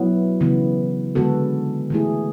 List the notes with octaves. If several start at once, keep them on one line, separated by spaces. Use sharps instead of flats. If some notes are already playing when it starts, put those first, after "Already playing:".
Already playing: F#3 B3 E4
C#3 E3 B3
D3 G#3 B3 F#4 A4
E3 A3 E4 G#4